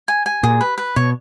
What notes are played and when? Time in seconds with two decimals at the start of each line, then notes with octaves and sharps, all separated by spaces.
0.08 G#5
0.26 G#5
0.43 A#2 G#4
0.61 B4
0.78 B4
0.96 B2 C#5